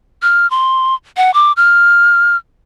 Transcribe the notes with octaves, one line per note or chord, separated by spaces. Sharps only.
F6
C6
F#5
D6
F6